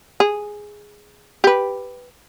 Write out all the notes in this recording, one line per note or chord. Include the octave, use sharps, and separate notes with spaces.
G#4
G4 B4